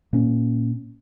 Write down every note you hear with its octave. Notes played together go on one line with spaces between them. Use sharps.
A#2 A#3 C#4